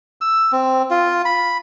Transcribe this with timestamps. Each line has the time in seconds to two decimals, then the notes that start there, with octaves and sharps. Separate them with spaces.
0.21 E6
0.52 C4
0.91 F4
1.25 B5